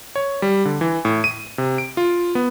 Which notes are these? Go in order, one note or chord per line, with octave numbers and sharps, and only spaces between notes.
C#5
G3
D3
E3
A2
D#7
C3
D7
F4
B3